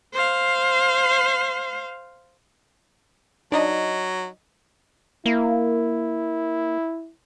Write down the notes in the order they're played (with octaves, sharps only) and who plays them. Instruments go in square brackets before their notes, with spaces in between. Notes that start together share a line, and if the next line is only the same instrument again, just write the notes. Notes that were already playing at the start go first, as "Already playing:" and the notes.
[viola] C5 F5
[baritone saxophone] F#3 [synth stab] D4 D#4 D#5
[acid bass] A#3 [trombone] E4